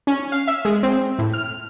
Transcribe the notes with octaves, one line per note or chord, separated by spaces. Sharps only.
C#4
F5
E5
G#3
C4
A2
F6